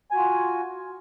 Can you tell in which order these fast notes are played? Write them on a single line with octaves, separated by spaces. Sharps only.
G#5 F#4 F4